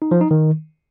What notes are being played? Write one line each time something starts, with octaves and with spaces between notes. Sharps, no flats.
D#4
F3
D#4
D#3